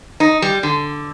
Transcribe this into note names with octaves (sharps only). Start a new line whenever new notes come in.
D#4
G3
D3